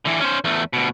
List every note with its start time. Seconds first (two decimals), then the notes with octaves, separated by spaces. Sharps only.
0.05 D3 E3
0.20 C#4 C5
0.44 E2 A3
0.73 D2 B2